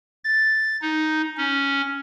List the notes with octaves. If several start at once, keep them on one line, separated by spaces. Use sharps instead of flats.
A6
D#4
C#4